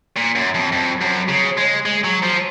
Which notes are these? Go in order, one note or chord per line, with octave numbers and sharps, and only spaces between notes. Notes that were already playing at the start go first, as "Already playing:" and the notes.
A#2
F#2
F2
F2
F#2
C#3
G#3
G#3
F#3
F3